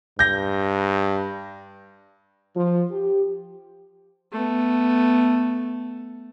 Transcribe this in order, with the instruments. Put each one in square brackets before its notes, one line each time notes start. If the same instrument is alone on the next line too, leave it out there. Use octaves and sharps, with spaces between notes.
[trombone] G2 [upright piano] G6 A#6
[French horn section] F3
G4
[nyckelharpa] A3 B3